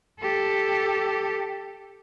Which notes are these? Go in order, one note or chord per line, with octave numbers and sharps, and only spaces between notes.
G4 A4